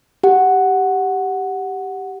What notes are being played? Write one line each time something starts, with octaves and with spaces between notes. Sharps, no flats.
G4 F#5